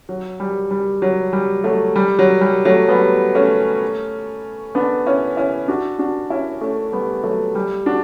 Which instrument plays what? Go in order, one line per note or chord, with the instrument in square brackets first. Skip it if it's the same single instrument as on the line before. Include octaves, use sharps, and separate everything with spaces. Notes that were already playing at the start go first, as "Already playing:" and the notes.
[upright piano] F#3
G3
G3
F#3
G3
F#3 A3
G3
F#3
G3
F#3 A3
G3 B3
A3 C#4
B3 D4
C#4 E4
C#4 E4
D4 F#4
D4 F#4
C#4 E4
A3 C#4
G3 B3
F#3 A3
G3
D4 F#4